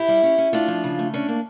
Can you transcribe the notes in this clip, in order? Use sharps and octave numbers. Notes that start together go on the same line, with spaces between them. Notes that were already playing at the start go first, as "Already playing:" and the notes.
Already playing: E4 G4
G3
C#4
C#4
A3 D4 F4
F3
C#3
A3
C#4 D4
A#3